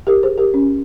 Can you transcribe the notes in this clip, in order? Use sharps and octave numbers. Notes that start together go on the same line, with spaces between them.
G4 A#4
G#4 C5
G4 A#4
C#4